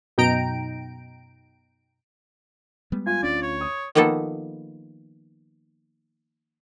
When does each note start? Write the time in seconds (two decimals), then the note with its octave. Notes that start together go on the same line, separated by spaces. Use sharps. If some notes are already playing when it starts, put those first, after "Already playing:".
0.18 F#2 B2 D#4 G5 A#5 D7
2.92 G3 G#3 B3
3.07 F4 G#5
3.23 D2 C#4 D4 D5
3.42 C#5
3.61 D#6
3.95 D#3 F3 A#3 B3 A4